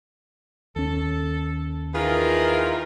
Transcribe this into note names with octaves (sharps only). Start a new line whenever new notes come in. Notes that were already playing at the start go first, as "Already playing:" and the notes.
D#2 C#4 A4
D#3 E3 F4 G#4 A#4